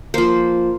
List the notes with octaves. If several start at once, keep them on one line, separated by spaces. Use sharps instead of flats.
F3 A#3 C5